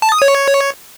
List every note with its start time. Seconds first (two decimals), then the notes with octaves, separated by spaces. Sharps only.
0.02 A5
0.12 D#6
0.22 C#5